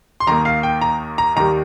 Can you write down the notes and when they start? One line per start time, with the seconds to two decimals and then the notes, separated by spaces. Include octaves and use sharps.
0.20 C6
0.27 D#2 D#3 A#3 A#5
0.45 F5
0.63 G5
0.81 A#5
1.18 A#5
1.36 D#2 D#3 G3 A#3 A#5